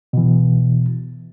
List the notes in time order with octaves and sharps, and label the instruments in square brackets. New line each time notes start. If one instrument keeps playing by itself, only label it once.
[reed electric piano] B2 E3